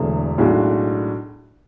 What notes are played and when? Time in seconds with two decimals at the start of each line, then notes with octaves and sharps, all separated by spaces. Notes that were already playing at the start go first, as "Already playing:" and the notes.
Already playing: E1 E2 D3 A3
0.38 B1 A2 G#3 D4 F#4